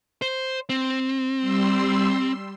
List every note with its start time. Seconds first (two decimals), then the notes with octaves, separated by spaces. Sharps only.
0.22 C5
0.69 C4
1.38 G3 C6 E6